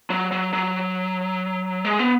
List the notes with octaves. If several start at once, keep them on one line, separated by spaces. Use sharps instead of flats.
F#3
F#3
F#3
G#3
B3